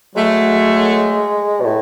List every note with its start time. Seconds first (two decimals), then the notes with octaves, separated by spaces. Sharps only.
0.16 F#3 G#3 A3
1.61 B2
1.65 A2